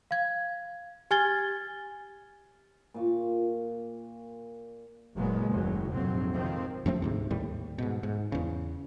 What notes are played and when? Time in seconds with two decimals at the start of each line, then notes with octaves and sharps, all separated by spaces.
0.11 F5 G#6
1.11 G4 G#5 F6 G#6 A6 G7
2.94 A#2 F5 C#6
5.15 F#1 A#2 F#3 G#3 B3
5.48 F#1 D#2 A2 F#3
5.91 F1 A#1 G#2 F#3 C4
6.33 C3 D#3 F3 C4
6.86 F#2 F3 A3 C4
7.02 D2 G#2 C3
7.31 D#2 A2 G3
7.78 G#2 B2
8.03 G#2
8.32 E2 C#3